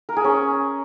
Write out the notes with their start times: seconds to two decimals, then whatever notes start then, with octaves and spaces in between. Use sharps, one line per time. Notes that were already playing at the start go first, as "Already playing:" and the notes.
0.09 A#4
0.17 G#4
0.24 C#4